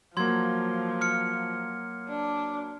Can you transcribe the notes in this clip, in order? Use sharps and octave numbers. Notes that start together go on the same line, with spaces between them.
F3 F#3 A#3 C6 G#6
F6 C#7
D4